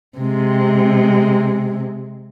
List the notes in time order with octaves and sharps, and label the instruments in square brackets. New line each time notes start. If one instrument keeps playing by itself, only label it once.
[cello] C3 G#3